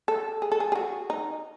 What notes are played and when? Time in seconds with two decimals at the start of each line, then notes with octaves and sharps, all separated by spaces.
0.08 A4
0.42 G#4
0.52 A4
0.60 G#4
0.72 G#4
0.75 F#4
1.10 D#4